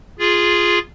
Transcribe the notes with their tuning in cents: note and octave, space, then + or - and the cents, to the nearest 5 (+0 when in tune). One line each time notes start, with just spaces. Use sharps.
F4 +0 G#4 -5